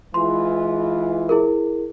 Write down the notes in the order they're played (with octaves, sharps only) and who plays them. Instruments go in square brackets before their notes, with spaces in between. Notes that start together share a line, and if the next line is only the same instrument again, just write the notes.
[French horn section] E3 G#3 F4 [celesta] C6
[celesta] E4 G#4 A#4